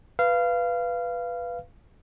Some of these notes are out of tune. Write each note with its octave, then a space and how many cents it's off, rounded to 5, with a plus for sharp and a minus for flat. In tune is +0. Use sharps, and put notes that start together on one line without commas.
B4 +0 F5 -20